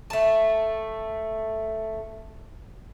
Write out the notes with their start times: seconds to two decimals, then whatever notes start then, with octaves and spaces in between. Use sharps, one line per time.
0.10 A3 A5